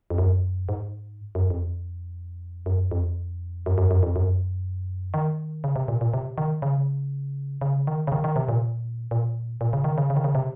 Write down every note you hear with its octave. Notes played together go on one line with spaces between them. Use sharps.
F2
F#2
G#2
F#2
F2
F#2
F2
F#2
F#2
F#2
F2
F#2
D#3
C#3
C3
A#2
A#2
C3
D#3
C#3
C#3
D#3
C#3
D#3
D#3
C3
A#2
A#2
A#2
C#3
D#3
C#3
C#3
D#3
C#3
C3